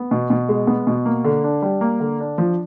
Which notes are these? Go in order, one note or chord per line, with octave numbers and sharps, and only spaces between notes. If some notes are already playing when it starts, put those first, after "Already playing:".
Already playing: B3
B2
B2
G#3
B3
B2
A#3
D3
D4
G3
A#3
D3
D4
F3